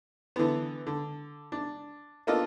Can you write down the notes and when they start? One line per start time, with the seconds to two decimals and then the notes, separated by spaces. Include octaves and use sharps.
0.36 D3 E3 B3
0.87 D3
1.52 D4
2.27 A#3 B3 D4 F4 A4 D#5